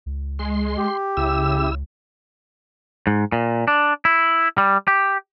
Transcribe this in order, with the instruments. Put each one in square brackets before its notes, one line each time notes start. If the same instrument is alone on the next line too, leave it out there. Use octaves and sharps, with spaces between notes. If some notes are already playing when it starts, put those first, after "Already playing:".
[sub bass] C#2
[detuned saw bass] G#3 [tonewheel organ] C6
[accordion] G4
[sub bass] C#2 [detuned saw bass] C#3 [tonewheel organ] E4 E6
[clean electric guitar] G#2
A#2
D4
E4
G3
G4